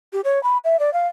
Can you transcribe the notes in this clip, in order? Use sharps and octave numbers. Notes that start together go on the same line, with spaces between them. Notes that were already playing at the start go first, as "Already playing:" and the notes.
G4
C#5
B5
E5
D5
F5